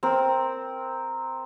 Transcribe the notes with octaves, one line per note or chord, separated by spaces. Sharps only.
C4 A#4